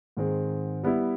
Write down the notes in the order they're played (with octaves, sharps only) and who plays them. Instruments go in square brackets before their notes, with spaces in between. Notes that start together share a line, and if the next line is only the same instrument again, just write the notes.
[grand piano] G#2 D#3 G#3 C4
G3 B3 E4